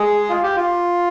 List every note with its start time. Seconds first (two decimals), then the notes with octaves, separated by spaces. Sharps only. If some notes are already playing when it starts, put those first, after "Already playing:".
Already playing: G#3 G#4
0.29 F4
0.43 G4
0.56 F4